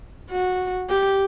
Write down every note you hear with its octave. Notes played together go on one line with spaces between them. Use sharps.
F#4
G4